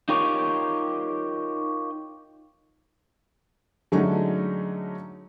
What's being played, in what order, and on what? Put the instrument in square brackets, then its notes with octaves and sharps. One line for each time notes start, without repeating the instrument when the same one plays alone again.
[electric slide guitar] D#4 F4 G4 A#4 C#5
[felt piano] D3 F#3 G#3 A3 C#4 D#4